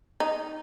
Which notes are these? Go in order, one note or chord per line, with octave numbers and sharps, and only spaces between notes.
D#4